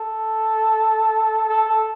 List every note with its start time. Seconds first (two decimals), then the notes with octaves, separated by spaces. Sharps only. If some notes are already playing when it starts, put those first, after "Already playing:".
Already playing: A4
1.49 A4
1.69 A4